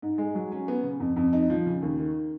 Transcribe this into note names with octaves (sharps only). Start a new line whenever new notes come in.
G#2
G#3
F#3
C#4
B3
C#3
F2
F2
D#4
F3
C#3
D#2
D#3